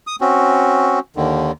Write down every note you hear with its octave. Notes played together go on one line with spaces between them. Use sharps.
D#6
C4 C#4 F#4
D#2 D3 D#3